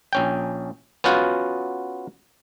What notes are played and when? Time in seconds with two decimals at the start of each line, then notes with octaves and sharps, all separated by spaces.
0.13 A#1 C#4 G5
1.04 B3 C#4 F4 F#4 F5